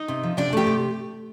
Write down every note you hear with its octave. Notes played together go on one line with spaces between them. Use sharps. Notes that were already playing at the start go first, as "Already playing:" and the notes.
Already playing: D#4 D#5
C3
F3
C3 D4 D5
A3 G4 G5
C3